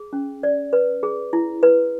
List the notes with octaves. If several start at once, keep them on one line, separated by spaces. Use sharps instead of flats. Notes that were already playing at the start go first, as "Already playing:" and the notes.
Already playing: G#4
C#4
D5
B4
G#4
E4
B4